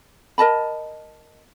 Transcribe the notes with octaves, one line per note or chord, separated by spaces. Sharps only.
A#4 D#5 A5 B5